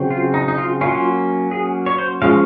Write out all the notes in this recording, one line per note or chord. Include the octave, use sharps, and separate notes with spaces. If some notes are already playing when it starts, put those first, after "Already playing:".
Already playing: C#3 F#3 C4
F4
D#4
D#4
F4
F#3 A#3 C#4 F4
G#4
C#5
C5
F3 G#3 C#4 F5